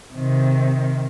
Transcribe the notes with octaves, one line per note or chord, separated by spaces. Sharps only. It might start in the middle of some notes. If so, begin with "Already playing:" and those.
C3 D#3